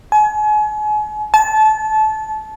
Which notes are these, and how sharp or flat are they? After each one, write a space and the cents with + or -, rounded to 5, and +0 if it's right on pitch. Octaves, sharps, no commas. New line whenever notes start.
G#5 +35
A5 -25